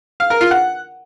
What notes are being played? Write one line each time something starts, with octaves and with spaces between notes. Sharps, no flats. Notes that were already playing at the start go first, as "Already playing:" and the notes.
F5
A#4
F4
F#5